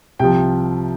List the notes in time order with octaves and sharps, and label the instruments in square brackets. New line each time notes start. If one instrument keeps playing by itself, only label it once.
[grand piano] C2 C3 F3 G5